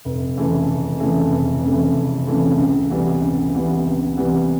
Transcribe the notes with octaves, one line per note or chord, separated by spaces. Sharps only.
F1
F2 C#3 E3 A3
F1
F2 C#3 E3 A3
F1
F2 C#3 E3 A3
F1
F2 C#3 E3 A3
C#2
C3 E3 G3 B3
C#2
C3 E3 G3 B3
C#2
C3 E3 G3 B3